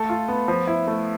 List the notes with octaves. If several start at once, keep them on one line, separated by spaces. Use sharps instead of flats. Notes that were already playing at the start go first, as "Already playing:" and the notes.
Already playing: A3 A4
F4
B3
F3
E4
A3